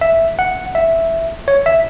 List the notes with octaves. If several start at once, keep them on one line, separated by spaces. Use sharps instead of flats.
E5
F#5
E5
C#5
E5